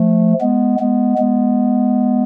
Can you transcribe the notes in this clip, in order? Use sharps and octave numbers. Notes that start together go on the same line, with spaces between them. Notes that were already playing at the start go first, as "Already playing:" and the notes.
Already playing: F3 A3
G#3 B3
G#3 B3
G#3 B3